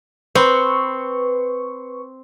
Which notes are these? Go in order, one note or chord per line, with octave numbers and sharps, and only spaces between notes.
C4 B4 C#6